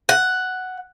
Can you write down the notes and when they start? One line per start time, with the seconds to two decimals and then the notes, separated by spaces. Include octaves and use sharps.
0.09 F#5